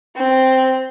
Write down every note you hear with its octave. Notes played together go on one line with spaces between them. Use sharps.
C4